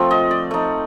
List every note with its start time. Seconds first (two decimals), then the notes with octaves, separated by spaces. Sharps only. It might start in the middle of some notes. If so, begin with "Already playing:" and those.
Already playing: F3 A3 C4 F5
0.11 D#5
0.31 D5
0.51 A3 D#4